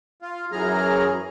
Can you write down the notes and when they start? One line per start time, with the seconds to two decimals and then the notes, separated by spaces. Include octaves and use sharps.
0.22 F4
0.52 F#2 E3 F#3 G#4 A#5 F6